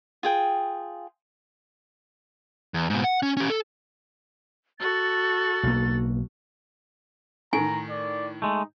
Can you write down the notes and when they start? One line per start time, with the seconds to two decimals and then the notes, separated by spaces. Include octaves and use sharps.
0.23 F4 G#4 G5
2.74 E2
2.90 G#2 B2
3.04 F#5
3.23 C#4
3.37 C#4 G4
3.50 A4
4.80 F#4 A4 A6
5.63 B1 A#3
7.53 A2 D#3 G#5 A#5
7.90 D5
8.42 G#3 A3 D#4